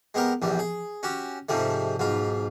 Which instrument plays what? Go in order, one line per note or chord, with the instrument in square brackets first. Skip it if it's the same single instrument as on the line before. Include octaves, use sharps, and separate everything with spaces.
[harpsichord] G#3 B3 G4 A#4
A#1 E2 G3
G#4
C#4 F#4 G4
G#2 C3 F3 G3 A3
B1 G#2 F4